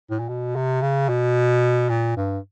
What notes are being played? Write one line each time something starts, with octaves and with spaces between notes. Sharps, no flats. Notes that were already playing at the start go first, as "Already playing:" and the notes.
A2
A#2
B2
C3
C#3
B2
A#2
G2